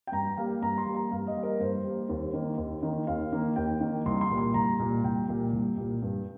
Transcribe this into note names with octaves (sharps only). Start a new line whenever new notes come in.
G5
G2 A#5
G3 A#3 F5
G2 A#5
C6
G3 A#3
A#5
G2 F5
D#5
G3 A#3
A#4
G2 C5
G3 A#3
D#2
D#3 A#3
D#2
D#3 A#3
D#2 F5
D#3 A#3
D#2 G5
D#3 A#3
C2 C6
C6
A#2 G3 A#3
C6
C2 A#5
A#2 G3 A#3
C2 G5
A#2 G3 A#3
C2
A#2 G3 A#3
G2